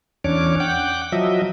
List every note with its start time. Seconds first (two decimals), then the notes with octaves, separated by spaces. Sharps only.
0.24 E2 C#4 D4 C#5 D6
0.60 F#5 G5 D6
1.12 F3 F#3 D#5 E5